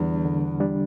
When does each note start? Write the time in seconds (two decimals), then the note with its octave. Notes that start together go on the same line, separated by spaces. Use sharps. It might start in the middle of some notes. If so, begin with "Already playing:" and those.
Already playing: E2 D3 G3 D4
0.25 D3
0.60 G3 D4